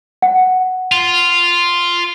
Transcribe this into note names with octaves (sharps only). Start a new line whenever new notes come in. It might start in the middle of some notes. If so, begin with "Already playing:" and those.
F#5
F4